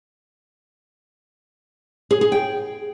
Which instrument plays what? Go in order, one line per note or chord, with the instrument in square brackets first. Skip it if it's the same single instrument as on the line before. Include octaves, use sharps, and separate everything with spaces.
[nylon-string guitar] G#4
G#4
G5